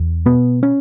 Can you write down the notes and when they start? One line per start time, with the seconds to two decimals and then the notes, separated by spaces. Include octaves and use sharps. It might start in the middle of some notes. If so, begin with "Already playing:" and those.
Already playing: E2
0.26 B2 B3
0.63 C#4